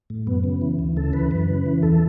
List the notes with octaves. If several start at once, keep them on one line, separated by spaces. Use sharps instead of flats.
A2
F#2 B3
C#3
E3
D2
C#3 A4
E3 B4
F#2
C#3
E3
E2 A4